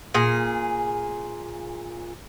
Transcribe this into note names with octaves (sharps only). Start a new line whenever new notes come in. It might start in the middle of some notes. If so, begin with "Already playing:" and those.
A#2 G#4